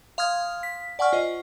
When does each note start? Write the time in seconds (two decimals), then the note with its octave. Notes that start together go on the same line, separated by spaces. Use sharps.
0.18 F5 C6 D#6 F6 G#6
0.63 B6
0.99 D5 F#5 G#5 C#6 F6
1.13 F4 C5 D#5